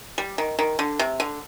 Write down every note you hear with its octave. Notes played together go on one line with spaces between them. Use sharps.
G3
D#3
D#3
D3
C3
D3